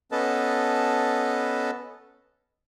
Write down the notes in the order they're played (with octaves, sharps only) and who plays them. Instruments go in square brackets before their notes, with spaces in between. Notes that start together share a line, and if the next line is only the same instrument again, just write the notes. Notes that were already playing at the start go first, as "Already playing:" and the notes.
[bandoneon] B3 C#4 A4 B4 D#5 A5